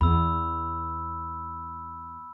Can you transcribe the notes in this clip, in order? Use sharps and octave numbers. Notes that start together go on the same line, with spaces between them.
E2 B5 E6